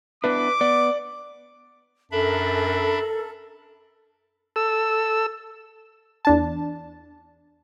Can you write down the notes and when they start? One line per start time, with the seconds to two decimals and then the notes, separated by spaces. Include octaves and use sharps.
0.24 B3 D4 E4 B4 D6
0.61 B3 D5
2.12 F#2 D4 A4 A#4 E5 B5
4.56 A4 E6
6.25 E2 D4 A5